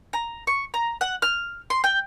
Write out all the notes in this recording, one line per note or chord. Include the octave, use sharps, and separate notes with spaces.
A#5
C#6
A#5
F#5
F6
C6
G5